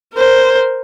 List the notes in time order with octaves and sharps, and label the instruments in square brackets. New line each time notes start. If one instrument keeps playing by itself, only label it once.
[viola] A#4 C5